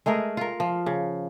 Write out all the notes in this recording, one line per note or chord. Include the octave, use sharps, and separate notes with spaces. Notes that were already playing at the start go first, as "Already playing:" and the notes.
G#3 A3 G#4 A#4
F4 A#4
F3
C#3